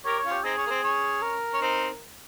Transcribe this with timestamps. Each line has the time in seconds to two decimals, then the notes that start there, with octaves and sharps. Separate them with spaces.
0.05 G4 A#4 C#5
0.19 C#5
0.25 C#4 F4
0.31 G4
0.44 C4 D#4 G#4
0.57 C#4
0.66 A#3
0.70 C4
0.84 C#4
1.22 A#4
1.53 C#4
1.62 C4 D#4